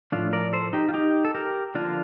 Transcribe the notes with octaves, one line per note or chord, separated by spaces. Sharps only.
A2 F3 A3 D4 F4
A#4 D5
A4 C5
D#4 G4
F4
D#4 G4
A4
G4 A#4
D3 F3 A#3 D4 F4